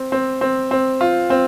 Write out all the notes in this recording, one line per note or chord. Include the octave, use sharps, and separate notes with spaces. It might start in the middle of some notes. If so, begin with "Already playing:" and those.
Already playing: C4
C4
C4
C4
F4
C4